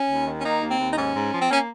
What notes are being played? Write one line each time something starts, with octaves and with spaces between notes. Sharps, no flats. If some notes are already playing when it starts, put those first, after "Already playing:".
Already playing: C#4
D#2
D#3
C#4
A#3 D#4
D#2
C4
D#2
D#4
G#2 C#4
G#2
F3
C4
A#3 C#4